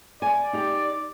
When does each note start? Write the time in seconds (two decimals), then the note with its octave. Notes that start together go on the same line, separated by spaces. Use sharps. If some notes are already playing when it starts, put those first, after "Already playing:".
0.22 D5 G#5
0.53 D#4 G4